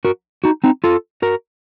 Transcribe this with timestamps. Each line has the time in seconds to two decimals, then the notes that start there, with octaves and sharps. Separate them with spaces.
0.05 F#4 A#4
0.44 D#4 F#4
0.64 C4 D#4
0.84 F4 A4
1.22 F#4 A#4